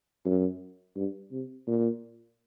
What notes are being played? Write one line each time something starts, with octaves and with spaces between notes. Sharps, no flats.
F#2
G2
C3
A#2